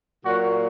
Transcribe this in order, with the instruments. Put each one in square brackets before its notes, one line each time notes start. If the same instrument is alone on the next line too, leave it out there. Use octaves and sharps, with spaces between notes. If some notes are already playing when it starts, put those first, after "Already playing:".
[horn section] A#2 F#3 F#4